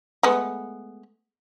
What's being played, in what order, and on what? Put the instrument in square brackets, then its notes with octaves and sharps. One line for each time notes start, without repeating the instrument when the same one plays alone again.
[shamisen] G#3 A3 B3